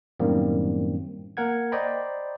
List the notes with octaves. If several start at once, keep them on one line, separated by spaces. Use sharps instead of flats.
F#2 A2 D#3 G3 A#3 C4
A#3 A#4 F#5 G#6
C5 D5 D#5 G5 A#5 B5